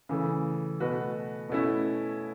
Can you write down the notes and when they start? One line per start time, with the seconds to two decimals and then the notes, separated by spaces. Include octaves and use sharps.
0.09 C#3 E3 A3
0.80 B2 A3 F#4 B4
1.49 B2 A3 C#4 E4